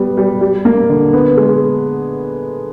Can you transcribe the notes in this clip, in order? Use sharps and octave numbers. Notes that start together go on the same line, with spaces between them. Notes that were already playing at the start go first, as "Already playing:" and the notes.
Already playing: G3 B3
G3
G3
A#3
D3
B3
G#3